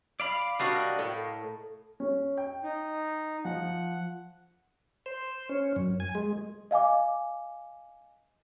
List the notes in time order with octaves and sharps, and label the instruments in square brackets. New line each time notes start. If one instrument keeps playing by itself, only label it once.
[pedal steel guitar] D5 F5 B5
[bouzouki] G3 D4 F#4 [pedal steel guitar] A#4 D#5 F5
[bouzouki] A2
[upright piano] C#4
G5
[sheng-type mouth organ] D#4
[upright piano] F3 [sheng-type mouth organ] F#5
[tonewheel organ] C5
C#4
F#2
G#5
G#3
[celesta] D#5 F5 G#5 D6